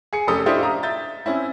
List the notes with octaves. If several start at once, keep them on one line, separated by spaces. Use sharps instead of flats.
G#4 C#7
F1 C#4 G4 A4 D#6
D4 E4 F4 G4 C5 D#5
F5 A#5 D#6
E5 G6 A6
C4 C#4 E4